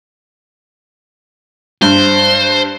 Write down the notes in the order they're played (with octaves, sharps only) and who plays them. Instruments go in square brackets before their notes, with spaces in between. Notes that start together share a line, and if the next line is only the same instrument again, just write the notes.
[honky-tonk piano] G2 [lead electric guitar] C5